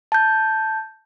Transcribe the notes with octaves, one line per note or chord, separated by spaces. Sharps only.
A5 G6